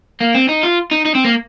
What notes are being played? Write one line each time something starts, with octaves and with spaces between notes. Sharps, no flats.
A#3
C4
D#4
F4
D#4
D#4
C4
A#3